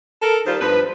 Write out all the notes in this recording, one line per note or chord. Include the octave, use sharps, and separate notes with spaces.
A4 A#4
D#3 G3 F4 C5
G2 F3 B4